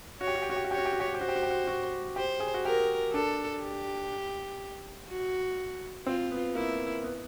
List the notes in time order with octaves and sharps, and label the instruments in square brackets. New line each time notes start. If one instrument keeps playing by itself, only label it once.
[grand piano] F#4 [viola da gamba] C#5
[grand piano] G4
F#4
G4
F#4
G4
F#4
[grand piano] G4 [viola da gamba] C#5
[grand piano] F#4
G4
F#4
G4
F#4
G4
[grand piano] F#4 [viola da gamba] C5
[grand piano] G4
F#4
G4
F#4
F#4
[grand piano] G4 [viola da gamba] C5
[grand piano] G#4
F#4
[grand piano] G4 [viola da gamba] A#4
[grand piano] D4 [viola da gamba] A4
[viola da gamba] G4
F#4
[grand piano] C4 [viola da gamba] F4
[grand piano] B3
[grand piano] A#3 [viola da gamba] E4
[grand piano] B3